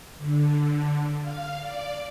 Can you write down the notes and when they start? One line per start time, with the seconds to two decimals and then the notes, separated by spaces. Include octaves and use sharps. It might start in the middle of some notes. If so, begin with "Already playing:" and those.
0.18 D3
1.21 F5
1.61 D5